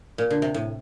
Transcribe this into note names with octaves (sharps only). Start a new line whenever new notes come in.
A#2
D3
C3
A2